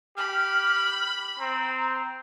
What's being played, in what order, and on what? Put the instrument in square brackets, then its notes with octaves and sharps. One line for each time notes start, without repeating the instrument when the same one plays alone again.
[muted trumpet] G4 [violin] B5 [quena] F6
[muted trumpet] C4 [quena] A#5